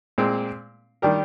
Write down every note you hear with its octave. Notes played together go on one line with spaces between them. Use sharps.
A#2 G#3 C4
D#3 G3 D4 G4 A#4